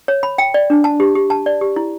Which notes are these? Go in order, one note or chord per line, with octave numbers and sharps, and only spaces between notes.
C#5
B5
G5
D5
D4
A5
G4
G4
A5
D5
G4
E4